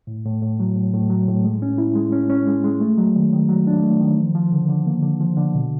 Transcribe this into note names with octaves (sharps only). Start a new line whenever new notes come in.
A2
A2
A2
F#3
A2
A2
F#3
A2
G#3
C#4
E4
G#3
C#4
C#4
G#3
G#3
A3
F#3
D#3
D#3
F#3
D4
A3
D#3
F3
F3
D3
D3
A#3
D3
F3
D3
B2